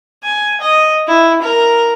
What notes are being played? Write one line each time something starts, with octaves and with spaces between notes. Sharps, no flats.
G#5
D#5
E4
A#4